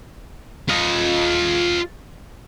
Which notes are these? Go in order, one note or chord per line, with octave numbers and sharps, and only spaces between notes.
F4 D#5